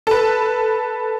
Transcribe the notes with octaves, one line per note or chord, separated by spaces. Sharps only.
A4 B4